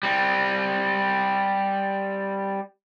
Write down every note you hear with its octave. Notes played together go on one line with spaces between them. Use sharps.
G3 C4